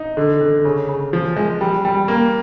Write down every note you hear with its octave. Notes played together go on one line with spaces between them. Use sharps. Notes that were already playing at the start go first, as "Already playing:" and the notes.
Already playing: D#4
D3
D3
C#3
C#3
F3
G#3
G3
G3
A#3